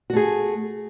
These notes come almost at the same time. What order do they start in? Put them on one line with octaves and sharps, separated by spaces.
F#4 A3 G#4